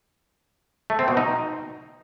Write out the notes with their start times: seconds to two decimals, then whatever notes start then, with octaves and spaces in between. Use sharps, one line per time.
0.90 A3
0.99 C4
1.08 B2
1.17 D#4